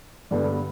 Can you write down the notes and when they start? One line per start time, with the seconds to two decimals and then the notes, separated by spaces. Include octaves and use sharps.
0.31 G2 D3 G3 B3